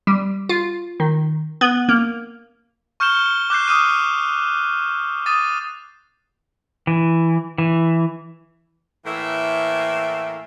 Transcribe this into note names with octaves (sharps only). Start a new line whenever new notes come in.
G3
F4
D#3
B3
A#3
C#6 F6 G6 C#7 E7 G7
D6 F#6 G6 C7
D6 D#6 F6 D#7
D6 D#6 A6 D#7
E3
E3
A2 E3 A3 A#3 E5